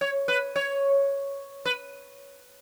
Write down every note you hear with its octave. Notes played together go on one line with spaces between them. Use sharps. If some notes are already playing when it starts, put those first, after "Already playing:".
C#5
B4
C#5
B4